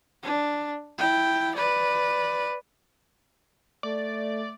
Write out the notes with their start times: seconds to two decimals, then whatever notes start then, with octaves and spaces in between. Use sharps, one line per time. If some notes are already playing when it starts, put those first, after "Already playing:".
0.23 D4
0.98 E4 G5
1.55 B4 D5
3.83 A3 D5